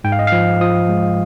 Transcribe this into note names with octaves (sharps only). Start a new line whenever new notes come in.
G#2 G5
F5
D#5
F3 F5
F3 D#6
G#3